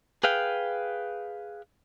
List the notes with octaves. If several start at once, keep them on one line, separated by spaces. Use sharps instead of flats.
G#4 B4 F5 G5